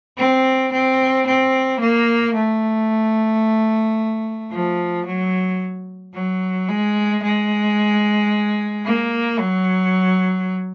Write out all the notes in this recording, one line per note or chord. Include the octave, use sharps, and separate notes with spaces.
C4
C4
C4
A#3
A3
F3
F#3
F#3
G#3
G#3
A#3
F#3